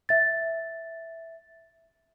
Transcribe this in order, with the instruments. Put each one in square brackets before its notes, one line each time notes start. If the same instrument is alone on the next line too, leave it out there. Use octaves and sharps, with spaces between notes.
[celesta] E5 A6